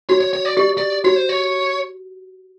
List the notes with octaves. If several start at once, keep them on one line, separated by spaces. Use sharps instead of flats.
F#4 C#5
C#5
C#5
D5
G4 D5
D5
F#4 C#5
C5
C#5